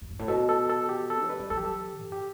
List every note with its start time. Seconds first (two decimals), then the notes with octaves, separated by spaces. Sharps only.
0.02 F#2
0.11 G2
0.19 A2
0.28 B2 A4
0.49 A4
0.70 A4
0.89 G4
1.10 A4
1.29 A3 B4
1.39 G3
1.50 F#3 A4
1.57 G4
1.65 A4
2.02 F#2
2.12 G4